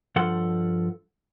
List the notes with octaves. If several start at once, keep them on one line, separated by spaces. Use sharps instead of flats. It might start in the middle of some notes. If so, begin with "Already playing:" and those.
G2 F3 A4 F#5 C6